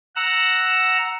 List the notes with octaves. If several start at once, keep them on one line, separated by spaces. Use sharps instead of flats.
F#5 A#5 E6